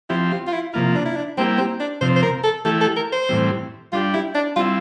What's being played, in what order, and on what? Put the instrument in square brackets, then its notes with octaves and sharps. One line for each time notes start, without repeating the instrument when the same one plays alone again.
[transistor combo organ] F3 C4 G4 [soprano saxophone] E4
[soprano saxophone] F4
F4
E4
[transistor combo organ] C3 F3 A#3 F4 [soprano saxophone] E4
[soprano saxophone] D4
E4
D4
[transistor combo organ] G3 A#3 E4 G4 [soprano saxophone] C4
[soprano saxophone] C4
D4
[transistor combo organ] C3 F3 C4 [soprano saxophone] C5
[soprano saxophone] C5
A#4
A4
[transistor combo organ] E3 A3 E4 G4 [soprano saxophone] A4
[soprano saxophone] A4
A#4
C5
[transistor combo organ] A2 E3 G3 C4
[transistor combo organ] G3 D4 G4 [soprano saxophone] F4
[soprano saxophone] E4
D4
[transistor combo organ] G3 C4 E4 [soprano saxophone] F4